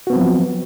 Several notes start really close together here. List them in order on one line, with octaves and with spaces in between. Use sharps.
F#4 B3 C4 F#3 F3